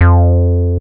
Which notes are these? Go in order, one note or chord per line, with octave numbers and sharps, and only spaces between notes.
F2